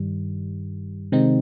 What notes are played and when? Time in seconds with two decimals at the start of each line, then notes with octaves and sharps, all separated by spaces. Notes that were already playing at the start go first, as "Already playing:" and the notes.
Already playing: G2 D#3 G3
1.12 C3 D#3 G#3 C4 D#4